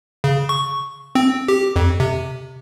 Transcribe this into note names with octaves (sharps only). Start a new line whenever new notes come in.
C#3
C#6
C4
G4
F2
C3